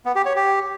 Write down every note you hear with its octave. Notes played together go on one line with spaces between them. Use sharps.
B3
G4
C#5
G4